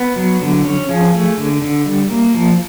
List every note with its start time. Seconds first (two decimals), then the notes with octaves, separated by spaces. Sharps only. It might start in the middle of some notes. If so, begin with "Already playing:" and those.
Already playing: B3
0.16 F#3
0.41 D3
0.65 C#4
0.89 F3 G#4
1.13 A3
1.37 D3
1.62 D3
1.86 G3
2.10 A#3
2.34 F3